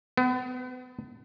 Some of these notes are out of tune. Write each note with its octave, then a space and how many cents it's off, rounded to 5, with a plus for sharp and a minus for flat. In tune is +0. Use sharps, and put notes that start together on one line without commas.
B3 +35